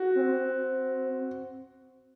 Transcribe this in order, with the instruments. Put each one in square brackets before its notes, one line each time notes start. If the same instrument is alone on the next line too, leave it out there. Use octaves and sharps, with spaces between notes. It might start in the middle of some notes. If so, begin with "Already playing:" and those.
Already playing: [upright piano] F#4
[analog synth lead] C4